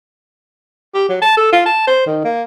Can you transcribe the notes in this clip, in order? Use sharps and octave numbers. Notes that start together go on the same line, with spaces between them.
G4
F#3
A5
A4
F4
A5
C5
D#3
A#3